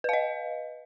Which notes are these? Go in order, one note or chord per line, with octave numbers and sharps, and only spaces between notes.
B4 D#5 F5